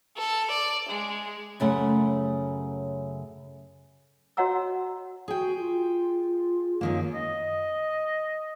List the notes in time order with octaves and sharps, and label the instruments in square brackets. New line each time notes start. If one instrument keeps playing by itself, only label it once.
[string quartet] A4
D5
G#3
[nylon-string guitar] F#2 C#3 A3 F#5
[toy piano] F#4 C#5 D#5 F#5 A#5 E6
[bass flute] F#4 [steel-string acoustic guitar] G#4 G5
[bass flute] F4
[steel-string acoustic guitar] F#2 D#3 A#3
[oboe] D#5